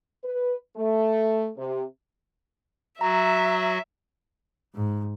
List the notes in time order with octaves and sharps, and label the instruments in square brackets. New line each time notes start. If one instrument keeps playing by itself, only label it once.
[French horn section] B4
A3
C3
[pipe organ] F#3 F#4 [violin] E5 [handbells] A#5
[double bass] G#2